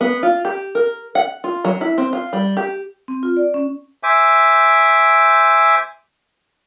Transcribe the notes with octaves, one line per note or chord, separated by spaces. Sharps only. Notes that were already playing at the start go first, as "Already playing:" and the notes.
B3
F4
G4
A#4
F#5
F4
F#3
E4
C4
F4
G3
G4
C4
F4
D5
C#4
C5 E5 G#5 D6